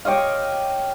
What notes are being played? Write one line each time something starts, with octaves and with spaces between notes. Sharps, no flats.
G4 C#5 D#5 F5